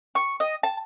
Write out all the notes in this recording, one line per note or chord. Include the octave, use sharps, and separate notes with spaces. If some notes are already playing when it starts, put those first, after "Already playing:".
C#6
D#5
A5